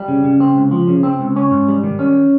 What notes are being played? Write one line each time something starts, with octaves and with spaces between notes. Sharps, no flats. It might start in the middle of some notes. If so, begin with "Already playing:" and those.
Already playing: G3
C#3
C#3
C4
C#2
F3
C#3
C4
C#2
C#4
G#2
G3
D#3
C#4